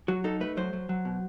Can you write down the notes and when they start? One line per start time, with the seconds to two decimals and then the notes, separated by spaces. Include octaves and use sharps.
0.08 F#3 F#4
0.24 D#4 A4
0.40 A3 B4
0.57 F#3 C5
0.73 F#3
0.89 F#3
1.05 B2